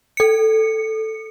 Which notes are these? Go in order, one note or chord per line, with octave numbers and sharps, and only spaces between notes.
A4 C#7